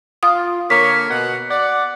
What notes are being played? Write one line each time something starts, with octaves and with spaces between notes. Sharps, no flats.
F4 D#6
D3 A#3 C#5 B6
B2 F#5
D5 F#5